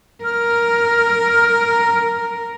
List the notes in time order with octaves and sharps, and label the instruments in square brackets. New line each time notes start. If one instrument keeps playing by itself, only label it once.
[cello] A#4 [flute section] F6